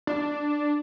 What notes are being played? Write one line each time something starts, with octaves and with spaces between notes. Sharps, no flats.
D4